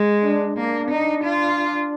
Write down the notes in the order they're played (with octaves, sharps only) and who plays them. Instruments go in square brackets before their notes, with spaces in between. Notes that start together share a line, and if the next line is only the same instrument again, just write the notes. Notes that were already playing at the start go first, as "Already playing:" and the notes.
Already playing: [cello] G#3
[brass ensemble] D4
[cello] A#3 [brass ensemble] D4
[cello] D#4
F4